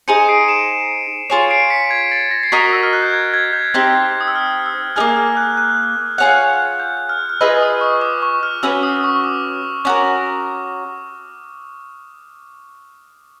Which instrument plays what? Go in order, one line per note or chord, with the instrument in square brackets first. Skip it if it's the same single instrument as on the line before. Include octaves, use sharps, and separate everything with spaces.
[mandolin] D#4 G#4 C5 [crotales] C#7 D#7
[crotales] C7 D7
D7 E7
[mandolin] F4 G#4 C#5
[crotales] C7 D7
B6 C#7
G#6
A6
A#6
C7
[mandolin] F#4 A#4 D#5 [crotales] B6
[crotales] E6
F6
F#6
G6
G#6
G#6
G6
[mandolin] C4 D#4 G4
[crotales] D#6
E6
F6
E6
[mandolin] D#4 G#4 [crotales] F6
[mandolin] A#3
[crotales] F6
F#6
F#6
[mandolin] F4 G#4 C#5 F#5 [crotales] F#6
[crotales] G6
F6
F6
[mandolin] F4 G#4 B4 D#5 [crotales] E6
[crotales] D#6
C#6
D6
C#6
F6
[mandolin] C#4 F#4 B4 [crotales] E6
[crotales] D#6
C#6
D6
[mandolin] C#4 F#4 A#4 [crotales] D6